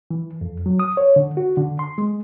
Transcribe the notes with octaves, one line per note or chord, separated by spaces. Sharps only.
E3
F2
F#3
D#6
C#5
D3
F#4
D3
C6
G#3